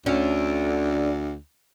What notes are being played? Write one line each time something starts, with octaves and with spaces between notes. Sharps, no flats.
D2 D3 C#4